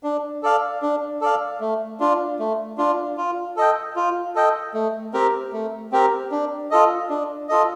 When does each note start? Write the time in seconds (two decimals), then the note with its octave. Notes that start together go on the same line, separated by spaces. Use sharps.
0.03 D4
0.43 A4 D5 F5
0.82 D4
1.21 A4 D5 F5
1.60 A3
2.00 D4 F4
2.39 A3
2.78 D4 F4
3.17 F4
3.57 A4 D#5 G5
3.96 F4
4.35 A4 D#5 G5
4.74 A3
5.14 C4 G4 A#4
5.53 A3
5.92 C4 G4 A#4
6.31 D4
6.71 F4 A4 D#5
7.10 D4
7.49 F4 A4 D#5